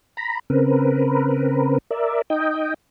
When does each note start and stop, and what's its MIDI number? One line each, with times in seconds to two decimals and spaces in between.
0.17 0.39 82
0.17 0.39 83
0.50 1.78 49
0.50 1.78 60
0.50 1.78 70
0.50 1.78 71
1.91 2.22 70
1.91 2.22 74
1.91 2.22 76
2.30 2.74 63
2.30 2.74 75
2.30 2.74 79